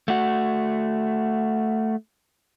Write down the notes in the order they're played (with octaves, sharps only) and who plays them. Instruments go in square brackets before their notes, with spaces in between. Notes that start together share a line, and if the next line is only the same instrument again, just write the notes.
[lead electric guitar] A3 F#4